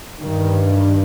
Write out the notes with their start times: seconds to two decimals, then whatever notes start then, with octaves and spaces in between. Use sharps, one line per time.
0.21 G2 D#3